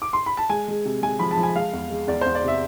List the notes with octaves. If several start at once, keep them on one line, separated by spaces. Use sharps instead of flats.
D6
C6
B5
A5
G#3 G#5
G#3
C3
G#3 G#5
F3 B5
A5
F3
G#5
G#3 F5
E2
G#3
E2 D5
E2 C5
D5
C3 E5